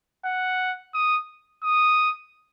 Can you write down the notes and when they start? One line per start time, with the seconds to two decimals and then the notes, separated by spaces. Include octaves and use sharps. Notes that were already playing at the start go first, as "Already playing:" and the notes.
0.25 F#5
0.94 D#6
1.64 D#6